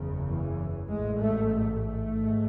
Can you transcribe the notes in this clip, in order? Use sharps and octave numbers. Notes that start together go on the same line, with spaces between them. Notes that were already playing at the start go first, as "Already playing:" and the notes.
Already playing: F#1 E2 C#3
E3
A1 G#2 G#3
A3
A3
A3
G#1 G#2